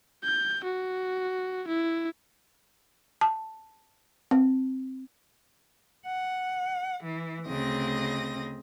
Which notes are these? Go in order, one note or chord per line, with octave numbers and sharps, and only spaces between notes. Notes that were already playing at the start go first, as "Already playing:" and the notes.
G6
F#4
E4
A5
C4
F#5
E3
D2 C#3 C4 D#5 A#6